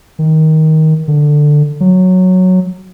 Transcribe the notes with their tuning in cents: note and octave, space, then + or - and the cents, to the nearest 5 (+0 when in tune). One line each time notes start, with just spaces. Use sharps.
D#3 +15
D3 +10
F#3 -5